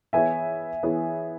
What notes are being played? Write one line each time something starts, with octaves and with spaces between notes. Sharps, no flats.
E3 B3 E4 G#4 C#5 E5 G#5
E3 B3 E4 G#4 C#5